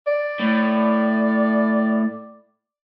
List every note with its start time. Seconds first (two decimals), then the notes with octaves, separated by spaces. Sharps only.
0.07 D5
0.40 A2